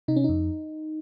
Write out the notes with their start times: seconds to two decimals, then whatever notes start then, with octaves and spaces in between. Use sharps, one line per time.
0.08 C3 D#4
0.16 C#4
0.24 F2 D#4